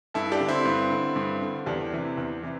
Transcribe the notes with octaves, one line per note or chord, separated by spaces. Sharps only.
G2 E4 A4
D4 G4
D3
C4 E4
G2
D3
G2
D3
E2 D4 G4
C3 E3
E2
C3 E3